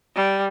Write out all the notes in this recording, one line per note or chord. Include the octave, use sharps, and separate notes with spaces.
G3